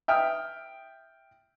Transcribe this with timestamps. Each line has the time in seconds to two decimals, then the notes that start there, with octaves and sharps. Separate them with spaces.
0.08 E5 G5 D#6 F6